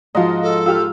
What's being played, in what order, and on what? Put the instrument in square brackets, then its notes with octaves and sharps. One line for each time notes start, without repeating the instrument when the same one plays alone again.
[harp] G#2 F3 [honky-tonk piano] F4 F#4 D#5
[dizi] A4
[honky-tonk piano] F4 G4 [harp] E6 F6